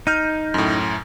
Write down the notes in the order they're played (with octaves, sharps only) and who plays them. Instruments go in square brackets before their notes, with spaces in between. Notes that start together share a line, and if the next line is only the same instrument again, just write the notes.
[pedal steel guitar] D#4 [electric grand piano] F6 G6 D#7
[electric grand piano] F#2 A2